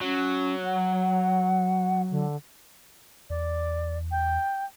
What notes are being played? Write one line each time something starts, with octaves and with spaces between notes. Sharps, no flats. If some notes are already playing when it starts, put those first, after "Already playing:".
F#3 C#4
F#5
D3
E2 D5
G5